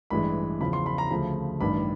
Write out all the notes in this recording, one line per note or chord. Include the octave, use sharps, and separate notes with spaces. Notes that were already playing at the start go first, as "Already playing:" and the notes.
A1 G2 E3 G#3 B5
E2 C#3 F3 B5
C6
B5
A#5
D2 C#3 F3 A3 B5
A1 G2 D#3 B5